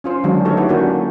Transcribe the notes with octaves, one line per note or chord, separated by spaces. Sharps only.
C#4 F4 C5
D3 D#3 F#3 G#3 D4
A3 D#4 G4 A4 C#5
E4 F#4 G4 B4
A#3 C#4 D4 F#4 G4